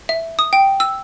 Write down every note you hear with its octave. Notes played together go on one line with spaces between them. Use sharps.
E5
D#6
G5
E6